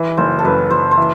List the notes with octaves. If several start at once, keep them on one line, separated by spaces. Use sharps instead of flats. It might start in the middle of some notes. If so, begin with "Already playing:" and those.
Already playing: E3
F#1 C5
A4
F#2 B4
F#1 C5
C5
E3